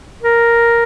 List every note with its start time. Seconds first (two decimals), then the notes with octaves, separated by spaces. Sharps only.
0.22 A#4